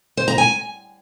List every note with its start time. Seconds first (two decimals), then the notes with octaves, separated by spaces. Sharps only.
0.17 C5
0.28 A#5
0.38 G#5